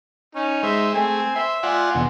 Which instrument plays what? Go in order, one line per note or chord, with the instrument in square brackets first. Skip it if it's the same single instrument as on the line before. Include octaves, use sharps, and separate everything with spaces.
[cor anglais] C#4 [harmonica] D#4
[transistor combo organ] G#3 C5 [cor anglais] E5
[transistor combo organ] A3 G#4 [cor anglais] C4 [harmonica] G#5
[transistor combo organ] C5 [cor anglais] E5
[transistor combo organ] F4 D5 F#5 [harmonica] G#5 C6
[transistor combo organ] E2 B2 D3